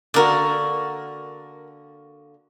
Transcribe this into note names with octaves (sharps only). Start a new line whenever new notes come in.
D3 A#3 F#4 A#4 D5